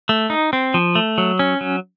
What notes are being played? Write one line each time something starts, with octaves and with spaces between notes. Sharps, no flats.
A3
D#4
C4
F3
A3
F#3
C#4
F#3